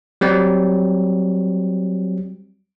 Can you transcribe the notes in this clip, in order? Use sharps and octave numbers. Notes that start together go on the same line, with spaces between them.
F#3 G3 C4